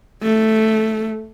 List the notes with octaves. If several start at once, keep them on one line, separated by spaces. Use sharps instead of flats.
A3